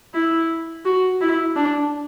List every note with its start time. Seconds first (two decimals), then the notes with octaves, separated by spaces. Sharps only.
0.14 E4
0.85 F#4
1.21 E4
1.56 D4